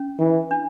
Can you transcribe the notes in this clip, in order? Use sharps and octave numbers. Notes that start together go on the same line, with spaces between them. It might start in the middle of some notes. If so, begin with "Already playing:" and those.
Already playing: C#4
E3
D4